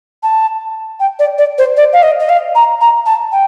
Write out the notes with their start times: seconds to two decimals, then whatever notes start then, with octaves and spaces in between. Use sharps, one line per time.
0.23 A5
1.00 G5
1.19 D5
1.38 D5
1.58 C5
1.77 D5
1.93 F5
2.03 D#5
2.20 D#5
2.29 F5
2.55 A#5
2.81 A#5
3.06 A5
3.32 G5